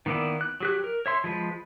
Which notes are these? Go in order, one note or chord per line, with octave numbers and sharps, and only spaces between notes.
D#3 A#3 B3 E4 D5
F#6
F#3 G4 F#6
A#4
C#5 E5 C6
F3 G#3 B4